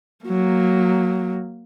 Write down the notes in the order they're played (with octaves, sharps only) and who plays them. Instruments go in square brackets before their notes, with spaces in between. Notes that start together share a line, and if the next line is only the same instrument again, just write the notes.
[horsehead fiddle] F#3 A#3